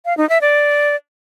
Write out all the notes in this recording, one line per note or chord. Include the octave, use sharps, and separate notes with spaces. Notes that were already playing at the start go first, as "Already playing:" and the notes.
F5
D#4
E5
D5